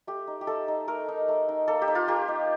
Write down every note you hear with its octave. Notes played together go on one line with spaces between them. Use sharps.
A3 G4
D#4
G4
A3 A4
D#4
A3 A#4
D#4
A3
D#4
A#3 A4
G4
D#4
F4
A#3 G4
D#4